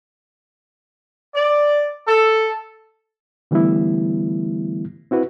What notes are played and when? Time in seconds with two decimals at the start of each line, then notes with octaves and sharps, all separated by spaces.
1.35 D5
2.07 A4
3.51 D3 E3 G3 A3 B3 E4
5.11 C4 E4 F#4 B4